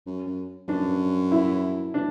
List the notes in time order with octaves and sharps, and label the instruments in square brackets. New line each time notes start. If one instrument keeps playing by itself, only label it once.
[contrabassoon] F#2
F#2
[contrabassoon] F#2 [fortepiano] D4
[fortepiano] E4
D4